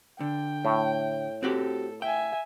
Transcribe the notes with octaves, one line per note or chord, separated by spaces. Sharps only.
D3 G5
A2
C4 F#4 G4 A4
E5 G5 G#5